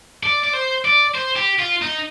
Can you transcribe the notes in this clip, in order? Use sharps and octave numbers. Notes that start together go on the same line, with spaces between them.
D5
D5
C5
D5
C5
G4
F4
D#4